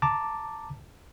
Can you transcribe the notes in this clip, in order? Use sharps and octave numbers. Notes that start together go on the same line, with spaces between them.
A5 A#5 D6